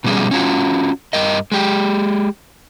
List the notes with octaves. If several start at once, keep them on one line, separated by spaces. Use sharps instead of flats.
B2 F3 G3 C#4 G#4
C#4 F4 F#4
G2 A#4 D#5
G#3 G4